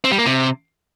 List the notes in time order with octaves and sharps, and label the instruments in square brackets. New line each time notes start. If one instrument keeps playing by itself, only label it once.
[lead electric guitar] C4
G3
A#3
C3